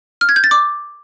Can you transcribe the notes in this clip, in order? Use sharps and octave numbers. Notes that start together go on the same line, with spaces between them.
F6
G#6
G6
A6
D6